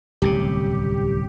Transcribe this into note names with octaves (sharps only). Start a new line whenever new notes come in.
D1 C2 C#3 G4